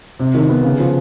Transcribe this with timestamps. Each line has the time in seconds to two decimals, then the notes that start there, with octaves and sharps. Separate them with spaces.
0.19 C3
0.34 D#3
0.49 B3
0.64 C#3
0.79 F3